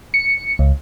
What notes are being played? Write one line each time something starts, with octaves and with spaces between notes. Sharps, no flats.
C#7
C#2